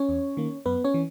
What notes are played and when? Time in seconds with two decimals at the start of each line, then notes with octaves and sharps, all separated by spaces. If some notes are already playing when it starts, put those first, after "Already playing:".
Already playing: C#4 C#5
0.09 E2
0.37 D#3 A#3
0.66 F#2 B3 B4
0.84 C#4 C#5
0.94 E3